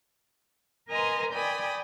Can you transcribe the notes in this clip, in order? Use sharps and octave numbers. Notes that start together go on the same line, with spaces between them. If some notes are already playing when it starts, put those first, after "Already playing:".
A#4 B4 D#5 G#5 A#5 C6
D5 G5 G#5 B5 D#6